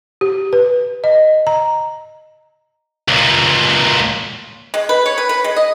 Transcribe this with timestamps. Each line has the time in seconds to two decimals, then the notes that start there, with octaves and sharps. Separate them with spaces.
0.21 G4
0.53 B4
1.04 D#5
1.47 A#5
3.08 C#2 A#2
4.74 G#3
4.89 B4
5.06 C#5
5.18 B4
5.29 B4
5.44 G#3
5.56 D#5